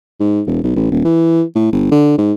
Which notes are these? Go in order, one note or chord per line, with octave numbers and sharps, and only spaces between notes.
G#2
E1
B1
A1
D#1
E3
A2
G1
D3
G#2